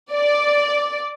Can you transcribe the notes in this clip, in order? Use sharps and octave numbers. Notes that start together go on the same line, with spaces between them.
D5